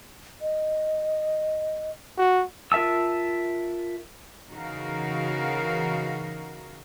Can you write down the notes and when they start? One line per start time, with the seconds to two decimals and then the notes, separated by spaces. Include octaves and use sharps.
0.41 D#5
2.18 F#4
2.72 F4 A#4 E5 A5 E6
4.50 C#3 E3 D#4 F#4 A#4 F5